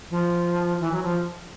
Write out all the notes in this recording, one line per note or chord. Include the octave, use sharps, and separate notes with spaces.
F3
E3
F#3
F3